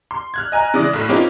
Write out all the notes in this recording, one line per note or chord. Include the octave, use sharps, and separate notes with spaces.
C6
F6 F#6 G#6
D#5 G#5 A#5 F#6
C#3 E3 G#3 D5 D#6 A#6
B1 A2
A#3 C4 C#4 D#4 F4